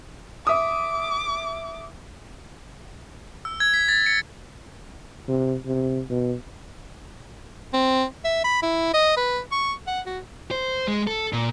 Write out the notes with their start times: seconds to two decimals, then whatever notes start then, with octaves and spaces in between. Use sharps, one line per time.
0.47 E5 D6 D#6
3.45 E6
3.60 G#6
3.74 B6
3.88 A6
4.06 C#7
5.28 C3
5.65 C3
6.10 B2
7.73 C4
8.25 E5
8.44 B5
8.62 E4
8.94 D#5
9.17 B4
9.52 C#6
9.87 F#5
10.06 F#4
10.51 C5
10.88 G#3
11.07 A4
11.33 A#2